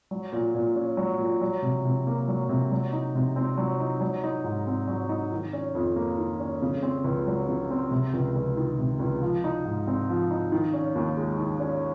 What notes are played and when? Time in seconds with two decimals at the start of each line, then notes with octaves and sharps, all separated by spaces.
0.11 F#3
0.33 A#2
0.55 A#2
0.76 C#4
0.97 F#3
1.19 A#2
1.42 F#3
1.62 C3
1.85 C3
2.07 A#3
2.28 F#3
2.49 C3
2.71 F#3
2.93 D#4
3.15 C3
3.36 C4
3.58 F#3
3.80 D#4
4.01 F#3
4.24 D#4
4.44 G#2
4.67 C4
4.88 F#3
5.09 D#4
5.32 D#3
5.53 C#4
5.75 F2
5.96 A#3
6.18 D#3
6.40 C#4
6.62 C#3
6.83 C4
7.04 C#2
7.27 F#3
7.49 C#3
7.71 C4
7.91 C3
8.14 C#2
8.36 C#2
8.57 D#3
8.79 C3
9.00 C#2
9.22 F3
9.44 D#4
9.65 G#2
9.87 C4
10.09 F3
10.31 D#4
10.52 D#3
10.73 C#4
10.95 D#2
11.17 G#3
11.39 D#3
11.60 C#4